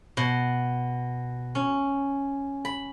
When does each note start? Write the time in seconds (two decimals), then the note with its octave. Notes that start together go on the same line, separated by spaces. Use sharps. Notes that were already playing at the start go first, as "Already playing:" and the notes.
0.17 B2
1.55 C#4
2.65 B5